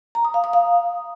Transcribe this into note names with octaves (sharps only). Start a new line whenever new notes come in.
A#5
D#6
F5
D#6
F5